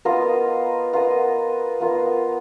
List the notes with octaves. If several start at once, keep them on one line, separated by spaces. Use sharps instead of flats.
B3 F4 A#4 D#5
B3 F4 A#4 D#5
B3 F4 A#4 D#5